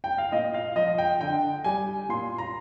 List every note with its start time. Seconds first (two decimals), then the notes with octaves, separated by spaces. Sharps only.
0.04 G5
0.18 F5
0.32 A#2 D#5
0.54 F5
0.76 F3 D#5
0.98 G5
1.21 D3 G5
1.64 G3 G#5
2.09 A#2 C6
2.38 A#5